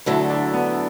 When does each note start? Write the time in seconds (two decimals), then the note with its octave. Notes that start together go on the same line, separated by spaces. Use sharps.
0.06 D2 D3 F#3 A3 E4
0.30 D4
0.53 B3